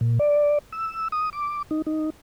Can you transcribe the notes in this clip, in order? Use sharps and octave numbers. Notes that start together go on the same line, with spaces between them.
A#2
D5
E6
D#6
D6
D#4
D#4